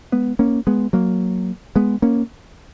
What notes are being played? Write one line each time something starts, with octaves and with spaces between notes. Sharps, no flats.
G#3 B3
A#3 C#4
G#3 B3
F#3 A#3
G#3 B3
A#3 C#4